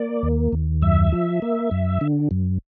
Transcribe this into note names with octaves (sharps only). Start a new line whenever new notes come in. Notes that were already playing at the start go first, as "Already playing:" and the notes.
Already playing: A#3 D5
D#2
D#2
F#2 E5
F3
A#3
F#2
D3
F#2